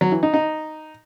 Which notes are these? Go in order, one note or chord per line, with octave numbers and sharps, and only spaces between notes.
F#3
E3
D#4
D#4